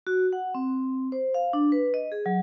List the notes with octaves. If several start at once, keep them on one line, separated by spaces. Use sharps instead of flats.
F#4
F#5
C4
C5
F5
D4
B4
D#5
G#4
F#3